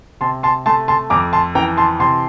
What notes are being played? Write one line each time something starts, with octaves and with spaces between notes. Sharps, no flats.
C3 A5 C6
A5 C6
A3 A5 C6
A5 C6
F2 A#5 D6
A5 C6
E3 G5 A#5
A5 C6
C3 A5 C6